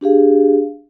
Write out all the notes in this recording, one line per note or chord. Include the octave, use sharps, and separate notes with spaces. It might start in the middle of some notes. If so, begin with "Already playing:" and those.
D4 G4 G#4 F5